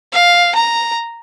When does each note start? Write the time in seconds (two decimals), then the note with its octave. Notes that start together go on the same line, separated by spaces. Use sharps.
0.13 F5
0.55 A#5